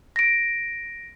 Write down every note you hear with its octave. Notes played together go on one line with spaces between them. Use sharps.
A#6 D7